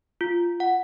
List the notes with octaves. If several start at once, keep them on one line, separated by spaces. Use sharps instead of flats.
F4
F#5